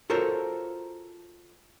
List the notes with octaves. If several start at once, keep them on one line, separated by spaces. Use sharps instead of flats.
F4 F#4 A4 A#4 C5 C#5